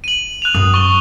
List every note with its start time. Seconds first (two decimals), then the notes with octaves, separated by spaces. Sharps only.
0.04 D#7 F#7
0.42 F#6 D#7 F7
0.54 F#2 C#4 D#6
0.74 C#6 G7